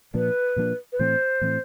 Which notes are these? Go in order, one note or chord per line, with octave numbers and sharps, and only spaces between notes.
A#2 F3 A#3 D4 B4
A#2 F3 A#3 D4
B4
A2 E3 A3 C4 C5
A2 E3 A3 C4